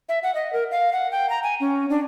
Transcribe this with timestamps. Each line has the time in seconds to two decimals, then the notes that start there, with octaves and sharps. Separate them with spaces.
0.09 E5
0.23 F#5
0.35 D#5
0.53 A#4
0.71 F5
0.93 F#5
1.11 G5
1.30 A#5
1.43 G#5
1.60 C#4
1.90 D4